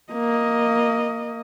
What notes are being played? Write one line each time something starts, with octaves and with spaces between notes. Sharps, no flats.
A#3 D#5